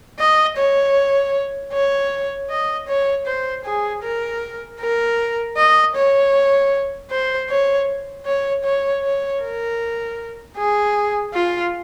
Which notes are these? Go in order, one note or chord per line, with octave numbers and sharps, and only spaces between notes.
D#5
C#5
C#5
D#5
C#5
C5
G#4
A#4
A#4
D#5
C#5
C5
C#5
C#5
C#5
C#5
A#4
G#4
F4